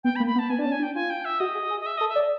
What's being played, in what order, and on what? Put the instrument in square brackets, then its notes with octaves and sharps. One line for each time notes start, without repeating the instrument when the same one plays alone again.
[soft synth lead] B3 [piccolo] G5
[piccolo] B5
[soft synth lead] A#3
[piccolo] B5
[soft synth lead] B3
[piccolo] A5
[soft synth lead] B3 [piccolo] G#5
[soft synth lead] D4
[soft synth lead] C#4 [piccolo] A5
[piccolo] G#5
[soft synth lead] D4
[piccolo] G5
[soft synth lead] F4 [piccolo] G#5
[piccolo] G5
E5
[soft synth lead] F#4 [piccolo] D#5
[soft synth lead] G#4
G#4
[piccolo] D#5
E5
[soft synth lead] A4 [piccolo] D#5
[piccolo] E5
[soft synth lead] D5